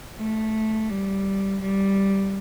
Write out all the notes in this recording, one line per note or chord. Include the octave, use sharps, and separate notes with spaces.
A3
G3
G3